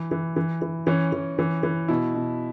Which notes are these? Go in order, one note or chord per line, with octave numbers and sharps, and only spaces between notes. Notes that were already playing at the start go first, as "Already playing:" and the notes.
Already playing: E3
E3
E3
E3
E3 C#4
E3
E3
E3
B2 E4
B2